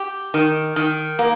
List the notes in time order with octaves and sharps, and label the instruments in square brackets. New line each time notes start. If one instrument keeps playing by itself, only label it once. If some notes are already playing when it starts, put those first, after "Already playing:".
Already playing: [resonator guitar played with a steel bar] G4
D#3
D#3
A#3